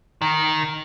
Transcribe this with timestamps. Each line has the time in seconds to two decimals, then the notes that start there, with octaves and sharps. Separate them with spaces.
0.22 D#3